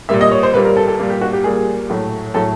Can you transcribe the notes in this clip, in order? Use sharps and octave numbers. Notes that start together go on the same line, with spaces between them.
A#2 G3 A#3 E5
D#5
C#5
C5
A#2 G3 A#3 B4
A#4
A4
A4
A#2 G3 A#3
G4
F#4
G4
A#2 G3 A#3 G#4
A2 F#3 A3
A2 F#3 A3 A4